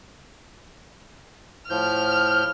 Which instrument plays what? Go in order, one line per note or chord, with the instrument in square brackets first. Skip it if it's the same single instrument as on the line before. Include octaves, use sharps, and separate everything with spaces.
[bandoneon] A2 F3 G6 [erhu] F6